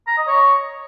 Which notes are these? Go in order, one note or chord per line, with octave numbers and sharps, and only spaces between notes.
A#5
D#5
C#5